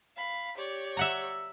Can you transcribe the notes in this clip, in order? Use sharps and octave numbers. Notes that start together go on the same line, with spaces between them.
F5 B5
G4 C#5 D5
E5 F#5 A#5